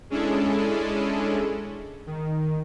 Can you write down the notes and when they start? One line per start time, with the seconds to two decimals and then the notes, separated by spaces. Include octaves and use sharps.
0.10 G#3 C#4 D4 E4 G#4 A4
2.07 D#3